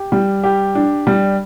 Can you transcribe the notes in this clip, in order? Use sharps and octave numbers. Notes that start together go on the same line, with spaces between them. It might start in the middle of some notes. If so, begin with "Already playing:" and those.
Already playing: G4
G3
G4
D4
G3